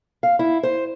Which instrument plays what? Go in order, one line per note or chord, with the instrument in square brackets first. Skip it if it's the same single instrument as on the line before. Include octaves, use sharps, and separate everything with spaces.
[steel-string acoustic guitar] F5
E4
C5